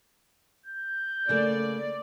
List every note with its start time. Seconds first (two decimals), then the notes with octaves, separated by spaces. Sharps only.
0.66 G6
1.29 C#3 A3 A#3 D5